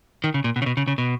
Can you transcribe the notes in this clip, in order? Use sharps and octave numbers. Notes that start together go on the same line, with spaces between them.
D#3
C#3
A#2
B2
C#3
B2
C#3
C#3
B2